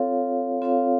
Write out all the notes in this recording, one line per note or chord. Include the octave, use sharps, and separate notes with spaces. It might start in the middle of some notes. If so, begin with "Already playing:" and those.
Already playing: C4 F4 A4 C#5 F5
C4 F4 A4 C#5 F5